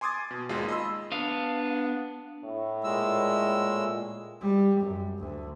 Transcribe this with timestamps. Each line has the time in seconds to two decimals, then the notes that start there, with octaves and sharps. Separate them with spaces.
0.01 G#5 C6 D6 D#6 G#6 A6
0.31 B2
0.49 G#1 D#2 G#3 F4
0.69 D#5 B5 C6 E6
1.12 B3 D4 F5
2.44 A2
2.84 A#2 G#3 E6
4.41 G3
4.79 F#2
5.17 D2